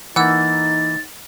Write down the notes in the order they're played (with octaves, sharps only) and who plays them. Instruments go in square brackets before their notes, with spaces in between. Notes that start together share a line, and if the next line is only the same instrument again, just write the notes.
[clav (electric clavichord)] E3 A#3 [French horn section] D#4 [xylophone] F#5 E6 [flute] A6